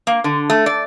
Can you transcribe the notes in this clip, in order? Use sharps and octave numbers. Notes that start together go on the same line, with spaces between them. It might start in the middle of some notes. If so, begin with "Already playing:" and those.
A#3
D3
A3
D5